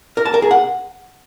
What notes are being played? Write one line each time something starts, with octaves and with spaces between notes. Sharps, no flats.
A#4
A5
A#4
G#4
F#5